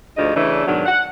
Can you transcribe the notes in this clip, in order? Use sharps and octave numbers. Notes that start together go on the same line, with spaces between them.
D2 G#2 F3 D4 D#5
C#3 E3 A3 D4
G#2 B2 D#3 F#3 D4
F#5